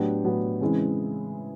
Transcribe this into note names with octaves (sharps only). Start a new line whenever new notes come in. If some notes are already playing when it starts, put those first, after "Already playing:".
Already playing: A2 F#3 B3 D4 G4
A2 F#3 B3 D4 G4
C#3 E3 G#3 C4 E4